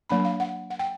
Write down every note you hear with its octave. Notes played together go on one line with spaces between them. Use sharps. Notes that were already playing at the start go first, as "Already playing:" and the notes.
F#3 A#3 D4 B5
F5
F#5
F#5
G5